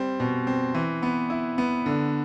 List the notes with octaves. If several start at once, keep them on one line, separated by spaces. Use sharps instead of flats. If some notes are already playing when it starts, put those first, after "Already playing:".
Already playing: G3 C4
B2
C4
E3
B3
E4
B3
D3